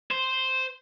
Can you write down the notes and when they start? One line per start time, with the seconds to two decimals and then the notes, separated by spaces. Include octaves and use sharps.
0.11 C5